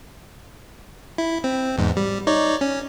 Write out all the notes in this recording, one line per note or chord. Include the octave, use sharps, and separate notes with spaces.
E4
C4
E2 G#2
G3
D#4 C#5 D5
C#4